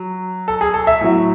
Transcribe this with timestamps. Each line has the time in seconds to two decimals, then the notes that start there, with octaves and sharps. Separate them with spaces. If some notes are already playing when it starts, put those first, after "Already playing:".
Already playing: F#3
0.48 A4
0.61 G#4
0.74 A4
0.87 E5
1.01 A2 F#3